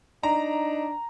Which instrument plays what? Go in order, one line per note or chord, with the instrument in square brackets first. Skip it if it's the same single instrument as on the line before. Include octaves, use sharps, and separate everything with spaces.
[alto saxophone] D4 [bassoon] D#4 [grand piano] A#5